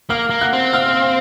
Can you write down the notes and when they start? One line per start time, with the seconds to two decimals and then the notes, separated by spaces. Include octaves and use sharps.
0.10 A#3 F5 F6
0.30 A#3
0.41 F#5 F#6
0.53 C4
0.73 F5 F6